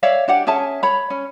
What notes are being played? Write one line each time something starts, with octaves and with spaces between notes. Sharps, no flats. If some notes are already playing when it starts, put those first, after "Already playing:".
C#5 D5 E5 F5
D4 G4 F#5
C#4 G#4 E5 A5
C#5 B5
C#4